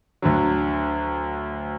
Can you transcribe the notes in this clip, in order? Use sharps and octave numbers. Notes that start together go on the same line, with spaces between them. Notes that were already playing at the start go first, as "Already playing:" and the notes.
D2 D3 F#3